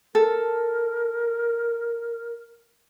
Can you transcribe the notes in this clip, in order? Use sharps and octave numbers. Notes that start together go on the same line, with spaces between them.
A4 A#4